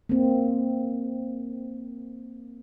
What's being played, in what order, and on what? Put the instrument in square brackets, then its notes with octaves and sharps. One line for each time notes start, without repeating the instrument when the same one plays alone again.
[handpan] A#3 C4